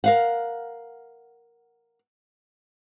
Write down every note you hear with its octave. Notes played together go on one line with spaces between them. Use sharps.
A#4 F5 F#5